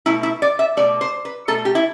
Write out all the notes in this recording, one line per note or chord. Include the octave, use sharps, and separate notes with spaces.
B2 A3 E4
E4
D5
E5
B2 A3 D5
C5
B4
B2 A3 A4
G4
E4